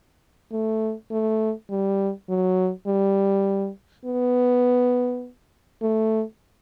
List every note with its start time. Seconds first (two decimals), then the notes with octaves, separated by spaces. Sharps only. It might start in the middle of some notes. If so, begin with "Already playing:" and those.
0.52 A3
1.11 A3
1.70 G3
2.29 F#3
2.87 G3
4.05 B3
5.82 A3